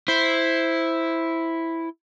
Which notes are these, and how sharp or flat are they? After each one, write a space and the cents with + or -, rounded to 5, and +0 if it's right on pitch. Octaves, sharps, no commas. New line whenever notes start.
E4 +0 C5 +0